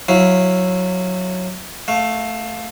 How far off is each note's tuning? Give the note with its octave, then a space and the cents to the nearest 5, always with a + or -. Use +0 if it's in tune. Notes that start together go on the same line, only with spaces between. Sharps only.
F#3 -15 E4 +0 F5 +5
A3 +0 F5 +20